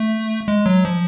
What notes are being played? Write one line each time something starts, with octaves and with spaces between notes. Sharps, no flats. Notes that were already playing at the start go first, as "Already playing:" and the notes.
Already playing: A3
G#3
F#3
F3